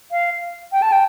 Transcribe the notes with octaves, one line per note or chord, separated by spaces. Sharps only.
F5
G5
A5
G5